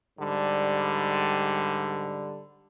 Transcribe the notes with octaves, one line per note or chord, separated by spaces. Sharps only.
G#2 D3 G3